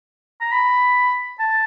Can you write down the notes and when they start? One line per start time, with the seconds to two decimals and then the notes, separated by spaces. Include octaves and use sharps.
0.41 A#5
0.52 B5
1.39 A5